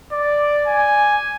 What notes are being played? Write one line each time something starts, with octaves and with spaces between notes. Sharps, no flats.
D5
G#5